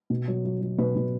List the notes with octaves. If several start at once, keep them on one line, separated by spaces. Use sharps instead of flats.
B2
F#3
F#3
F#3
B2 B4
B2